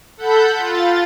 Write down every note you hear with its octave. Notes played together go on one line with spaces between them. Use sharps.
A4 F#5 B5 G6
F4 A6